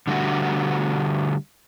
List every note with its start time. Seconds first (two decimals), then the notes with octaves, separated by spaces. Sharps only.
0.07 D3 G3 A3 F#4